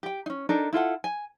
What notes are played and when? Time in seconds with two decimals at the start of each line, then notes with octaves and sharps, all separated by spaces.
0.03 G4 G5
0.26 C#4 D#4
0.49 D4 D#4 A4 A#4
0.73 E4 F4 A4 F#5
1.04 G#5